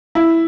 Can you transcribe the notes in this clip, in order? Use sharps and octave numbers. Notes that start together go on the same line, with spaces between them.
E4